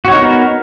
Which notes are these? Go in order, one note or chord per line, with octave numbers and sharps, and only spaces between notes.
B3 D#4 F#4 A#4 C#5